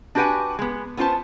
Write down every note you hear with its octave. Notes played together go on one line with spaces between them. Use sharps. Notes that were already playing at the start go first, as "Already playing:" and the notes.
D4 F#4 G4 B4 F#5 G#5
G#3 B3
B3 C#4 F4 C5 A5